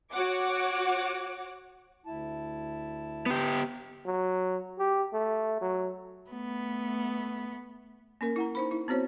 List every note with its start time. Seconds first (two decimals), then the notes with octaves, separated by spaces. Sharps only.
0.12 F#4 C#5 F#5 D6
2.06 D2 E4 A5
3.26 B3 G4
4.06 F#3
4.79 G4
5.13 A3
5.61 F#3
6.30 A3 B3
8.21 A#3 C#4 A#4
8.36 E4 F#5 A#5
8.55 D#4 C5 B5
8.71 E4
8.88 B3 C4 F#4 C5 C#5